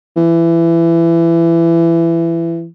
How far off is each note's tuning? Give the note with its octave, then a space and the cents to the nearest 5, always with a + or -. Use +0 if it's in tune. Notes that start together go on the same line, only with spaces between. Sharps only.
E3 +20